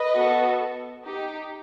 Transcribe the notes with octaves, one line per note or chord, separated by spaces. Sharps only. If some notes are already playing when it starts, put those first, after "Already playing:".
Already playing: B4 D#5
B3 F#4 A4
D#4 G4